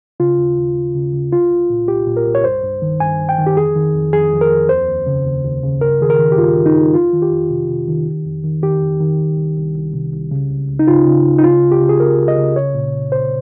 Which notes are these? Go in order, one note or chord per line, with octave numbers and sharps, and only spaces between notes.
C#3 F4
D#2
D#2
D#2
C#3
C#3
C2 F4
C2
A#2
C2 G4
A#2
A#4
C2
C#5
G2 C5
G2
D#3
G2 G#5
G2
G5
D#3
G4
F2 G#4
D#3
F2
F2 G#4
F2
A#4
F2
D#2 C5
D#2
C#3
D#2
D#2
C#3
G2 A#4
D#3 G#4
A#4
D#3
G4
G2 F4
D#3
D#4
G2
F2 F4
D#3
G4
F2
C3
C3
D#3
D#3
F2
D#3
D#3 G4
F2
D#3
C2
C2
C2
C2
C3
C2
C#3
C#2
C#2
D#4
C#3 F4
C#3
C#2
D#4
C#3 F4
C#2
G4
C#3
G#4
C#2 A#4
C#2
D#5
C#3
C2 C#5
A#2
C2
A#2 C5